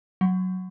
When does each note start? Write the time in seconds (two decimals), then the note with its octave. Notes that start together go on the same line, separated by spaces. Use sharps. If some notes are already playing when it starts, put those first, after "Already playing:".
0.21 F#3